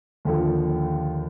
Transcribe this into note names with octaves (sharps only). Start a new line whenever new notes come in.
D#2 D3 F3